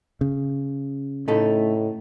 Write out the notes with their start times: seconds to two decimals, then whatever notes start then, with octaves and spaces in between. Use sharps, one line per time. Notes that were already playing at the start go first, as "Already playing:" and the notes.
0.21 C#3
1.28 A2 A3 D#4 A4